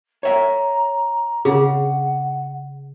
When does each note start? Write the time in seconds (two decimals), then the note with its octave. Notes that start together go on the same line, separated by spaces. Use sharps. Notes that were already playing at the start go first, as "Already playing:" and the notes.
0.23 C#5 E5 A#5
1.45 C#3 G#4 F#5